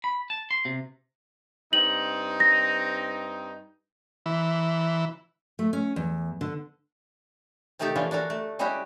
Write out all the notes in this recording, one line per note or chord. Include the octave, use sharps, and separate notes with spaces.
B5
A5
C6
C3
G2 C4 D#4 F#7
A#6
E3
A3
C#4
E2
D3
C3 D#3 A3 D#4 G4 A4
D3 E3 F3 A#3 C#4 F4
D4 F#4 A4 A#4
A3
G3 G#3 C#4 E4 F#4 G4